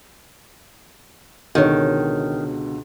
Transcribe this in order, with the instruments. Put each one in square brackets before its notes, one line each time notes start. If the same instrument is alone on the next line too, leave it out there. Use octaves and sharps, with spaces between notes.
[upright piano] C#2 B2 D3 [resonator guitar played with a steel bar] D#3 [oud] F#4 C#5